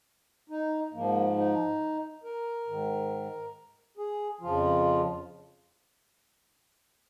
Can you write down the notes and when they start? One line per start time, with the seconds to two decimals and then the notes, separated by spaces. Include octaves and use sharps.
0.50 D#4
0.93 G#2 F3 A#3
1.37 D#4
2.24 A#4
2.67 G#2 D#3
3.97 G#4
4.41 F2 C#3 F3 F4